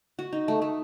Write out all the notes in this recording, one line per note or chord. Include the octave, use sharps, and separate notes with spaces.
F#4
D#4
A3
A3